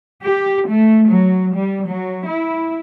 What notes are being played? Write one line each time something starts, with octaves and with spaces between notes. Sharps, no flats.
G4
A3
F#3
G3
F#3
E4